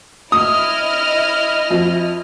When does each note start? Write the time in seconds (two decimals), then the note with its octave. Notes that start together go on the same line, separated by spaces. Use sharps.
0.32 E4 D#5 D#6 F6
1.70 F2